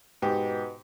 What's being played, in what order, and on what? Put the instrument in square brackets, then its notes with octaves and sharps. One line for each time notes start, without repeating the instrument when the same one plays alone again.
[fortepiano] G#2 G4 [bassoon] B2